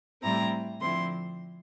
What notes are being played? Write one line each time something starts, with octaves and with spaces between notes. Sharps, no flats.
A2 G3 C4 E4 A#5
D3 F3 C4 E4 C6